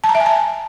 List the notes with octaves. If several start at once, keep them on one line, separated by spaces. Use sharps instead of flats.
A5
A#5
E5
G#5
A5